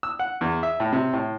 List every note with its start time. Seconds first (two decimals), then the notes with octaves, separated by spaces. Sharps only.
0.03 E6
0.19 F#5
0.41 E2
0.63 E5
0.80 A2
0.92 C3
1.13 A2